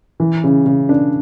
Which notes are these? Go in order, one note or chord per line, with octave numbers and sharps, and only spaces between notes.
E3
C#3
C#3
D4